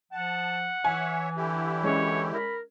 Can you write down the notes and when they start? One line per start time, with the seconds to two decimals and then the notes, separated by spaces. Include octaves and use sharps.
0.12 F3 F#5 A5
0.84 E3 C#5 E5 G#5
1.37 D3 E4 G4
1.83 G#3 C#4 C#5
2.34 A#4 B5